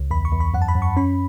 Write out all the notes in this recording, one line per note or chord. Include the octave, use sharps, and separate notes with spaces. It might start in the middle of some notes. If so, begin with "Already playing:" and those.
Already playing: C#2
E2 B5
C#6
E2
B5
F#2 F#5
A5
B5
F#2
C#6
C#4 B5